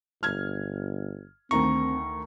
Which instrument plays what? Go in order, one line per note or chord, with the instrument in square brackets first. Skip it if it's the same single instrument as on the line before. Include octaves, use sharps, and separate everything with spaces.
[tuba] G1 [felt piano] F6 G#6
[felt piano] D2 D#3 A#5 [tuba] C4 [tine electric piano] C#6